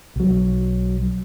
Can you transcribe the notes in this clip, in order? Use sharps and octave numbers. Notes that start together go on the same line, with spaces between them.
B1 F#3